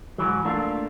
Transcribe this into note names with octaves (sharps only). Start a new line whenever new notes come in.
G#2 E3 F#3
A3 A#3 D4 F4